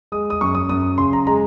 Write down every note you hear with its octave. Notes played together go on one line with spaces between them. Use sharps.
G#3 D#6
D#6
F#2 C#6
D#6
F#2 D#6
C#3 C6
A#5
G#3 A#5